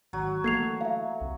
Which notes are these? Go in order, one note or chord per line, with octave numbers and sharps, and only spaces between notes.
G#1 F#3
E3 A3 A#3 A4 G#6 C7 F7
E5 F5
C2